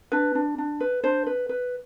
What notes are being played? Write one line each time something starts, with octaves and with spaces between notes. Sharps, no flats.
D4 B4
D4
D4
B4
D4 C5
B4
B4